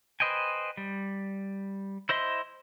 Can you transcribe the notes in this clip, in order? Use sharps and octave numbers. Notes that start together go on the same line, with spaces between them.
B4 C5 D#5 G5 G#5
G3
E4 C5 D#5 E5 C6